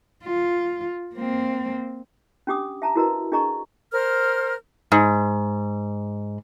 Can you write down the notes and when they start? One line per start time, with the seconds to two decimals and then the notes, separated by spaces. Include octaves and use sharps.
0.24 F4
1.15 A#3 C4
2.47 C#4 D4 G4 D6 D#6
2.82 E5 A5 A#5
2.96 E4 F#4 A#4 B4 D#5 A#5
3.32 D4 G#4 D#5 A#5 C#6
3.92 A#4 C5 F6
4.92 G#2